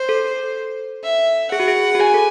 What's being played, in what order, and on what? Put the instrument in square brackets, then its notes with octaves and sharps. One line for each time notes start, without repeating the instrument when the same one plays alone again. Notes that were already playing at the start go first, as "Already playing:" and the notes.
Already playing: [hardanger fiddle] C5
[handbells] A4
[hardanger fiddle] E5
[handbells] G#4 [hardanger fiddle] F#5
[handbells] F#4
G#4
F#4
[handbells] G#4 [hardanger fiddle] G#5
[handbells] A4